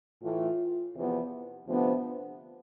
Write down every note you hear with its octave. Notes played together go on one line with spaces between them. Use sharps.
A2 E3 A3 F4
E2 C3 F3 B3
D2 C3 F3 B3 D4